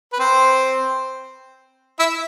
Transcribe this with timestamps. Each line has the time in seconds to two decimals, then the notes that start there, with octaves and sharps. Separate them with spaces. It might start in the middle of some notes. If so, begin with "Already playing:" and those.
0.13 B4
0.19 C4 C5
1.99 E4 E5